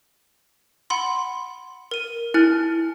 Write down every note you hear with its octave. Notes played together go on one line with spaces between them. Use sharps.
F#5 B5 C6
A#4 D#7
E4 G#5 F6